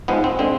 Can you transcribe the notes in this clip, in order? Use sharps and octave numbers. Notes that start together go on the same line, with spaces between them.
G#2 F3 G#3 B3
C4
D3 G#3 C4